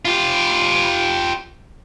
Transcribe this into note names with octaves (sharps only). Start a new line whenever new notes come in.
F4 G4